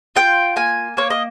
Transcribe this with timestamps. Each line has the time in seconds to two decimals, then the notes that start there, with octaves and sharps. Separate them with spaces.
0.16 F4 G5
0.56 A#3 G#5
0.97 A#3 C#5
1.10 D#5